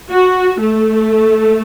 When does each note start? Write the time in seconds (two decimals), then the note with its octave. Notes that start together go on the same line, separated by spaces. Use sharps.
0.12 F#4
0.63 A3